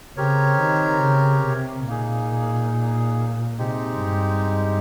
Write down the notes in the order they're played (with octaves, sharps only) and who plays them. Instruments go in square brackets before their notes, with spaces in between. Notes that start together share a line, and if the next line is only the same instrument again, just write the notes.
[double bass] C#3 [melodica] C4 G4 A#4 C#5
[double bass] D#3
C#3
C3
[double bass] A#2 [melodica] A#3 D#4 G#4
[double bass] C3 [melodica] G#3 C4 D#4 G4
[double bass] G2